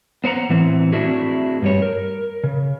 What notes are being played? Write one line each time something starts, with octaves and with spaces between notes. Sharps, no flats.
B3 C5 F#5 A#5
A2 E3 C4
A3 C4 D4 E4 F#4 G#4
G2 G3 C#5
A#4
C#3